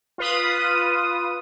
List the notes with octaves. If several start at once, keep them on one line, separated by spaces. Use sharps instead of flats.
F4 B4 D#6